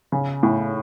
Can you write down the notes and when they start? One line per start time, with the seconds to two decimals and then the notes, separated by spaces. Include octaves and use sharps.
0.12 C#3
0.43 A2